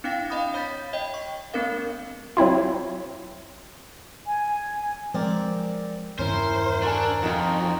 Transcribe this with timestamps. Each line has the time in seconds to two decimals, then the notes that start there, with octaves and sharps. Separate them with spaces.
0.04 C4 D4 E4 F5 G5 A#6
0.30 D#5 F5 B5 D#6
0.54 C#5 B5 G6 A6 B6
0.93 C#5 D#5 G5
1.14 C#6
1.54 A3 B3 C4 D4 A#4 F5
2.37 F#3 C4 E4 F4
4.27 G#5
5.14 F3 G#3 C4 A#4 D5
6.19 E2 G2 D#3 C#4 E4 A#4 C5
6.82 D4 F#4 A4 G#5
7.23 F2 D#4 F4 F#4